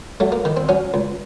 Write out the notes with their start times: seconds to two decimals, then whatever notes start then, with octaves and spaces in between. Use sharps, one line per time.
0.20 F#3 A3
0.32 A#3
0.45 D#3
0.57 C4
0.69 F#3 C#4
0.94 C#2